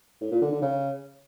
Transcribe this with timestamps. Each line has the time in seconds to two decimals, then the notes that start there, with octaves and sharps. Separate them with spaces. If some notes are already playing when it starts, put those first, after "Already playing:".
0.21 A2
0.31 A#2
0.41 D3
0.52 D3
0.62 C#3